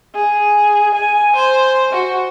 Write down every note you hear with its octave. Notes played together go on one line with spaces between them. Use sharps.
G#4
G#5
C5
F#4